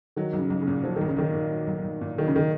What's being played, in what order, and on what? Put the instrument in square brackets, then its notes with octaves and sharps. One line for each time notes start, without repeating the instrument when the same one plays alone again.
[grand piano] D#3 [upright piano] F#3
[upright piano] B1
[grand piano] C#3
[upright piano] B1
[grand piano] C#3
[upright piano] A#2
[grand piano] F3 [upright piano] F#3
[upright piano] B1 [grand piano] D#3
[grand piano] C#3
[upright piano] B1 [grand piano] D#3
[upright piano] A#2
F#3
B1
B1
A#2
[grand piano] D#3 [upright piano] F#3
[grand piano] C#3
D#3